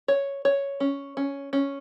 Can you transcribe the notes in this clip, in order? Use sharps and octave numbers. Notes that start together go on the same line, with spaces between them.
C#5
C#5
C#4
C#4
C#4